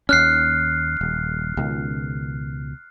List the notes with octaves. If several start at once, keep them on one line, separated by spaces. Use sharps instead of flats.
D#2 C#4 F6 F#6 C7
D#1
C#2 B2 D#3